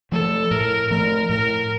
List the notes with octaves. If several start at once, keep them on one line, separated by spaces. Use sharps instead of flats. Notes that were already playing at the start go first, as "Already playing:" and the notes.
F3 A3 A4
A2 A#4
F3 A3 A#4
A2 A#4